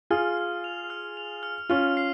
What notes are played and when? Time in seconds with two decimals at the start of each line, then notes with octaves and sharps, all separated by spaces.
0.10 F4 G#4 F6
0.38 F6
0.64 F7
0.90 F6
1.17 F7
1.43 F6
1.70 C#4 F4 F6
1.97 C7